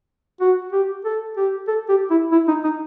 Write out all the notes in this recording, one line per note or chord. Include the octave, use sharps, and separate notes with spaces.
F#4
G4
A4
G4
A4
G4
E4
E4
D#4
D#4